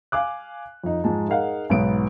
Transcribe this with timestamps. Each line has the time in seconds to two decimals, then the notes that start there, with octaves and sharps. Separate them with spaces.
0.12 F5 G#5 D6 F#6
0.84 F2 D#4
1.04 G#2 F3 G#3 A5
1.28 D#4 G#4 A#4 F5 F#5
1.70 B1 G#2 B3 D7